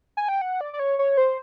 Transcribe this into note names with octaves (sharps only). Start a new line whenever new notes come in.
G#5
G5
F#5
D5
D5
C#5
C#5
C5